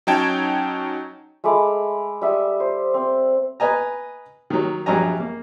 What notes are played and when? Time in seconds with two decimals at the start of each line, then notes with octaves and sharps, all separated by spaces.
0.07 F#3 C#4 D#4 G5 A5 G#6
1.44 G#3 A3 B5 D6
2.22 G3 E5 D#6
2.60 C5
2.94 C4
3.60 B4 D#5 G#5 A#5
4.50 D#3 F#3
4.86 A#1 G2 F#3 D#5 G#5 A#5
5.20 A#3